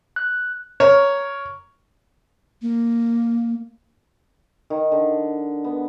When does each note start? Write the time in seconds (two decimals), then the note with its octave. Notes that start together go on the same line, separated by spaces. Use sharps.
0.16 F#6
0.80 A#4 C#5
2.62 A#3
4.70 D#3
4.92 D3
5.64 B3